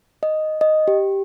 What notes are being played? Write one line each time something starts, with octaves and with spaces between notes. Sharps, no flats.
D#5
D#5
G4